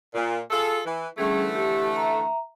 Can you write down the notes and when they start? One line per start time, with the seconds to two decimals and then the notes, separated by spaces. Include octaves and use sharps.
0.14 A#2
0.51 F4 G#4 A4
0.85 E3
1.18 D3 E3 G3 A3 C#4 G#4
1.55 G4
1.96 E5 A#5